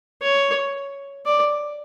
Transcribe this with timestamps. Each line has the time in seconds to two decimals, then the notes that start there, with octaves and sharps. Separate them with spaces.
0.22 C#5
1.25 D5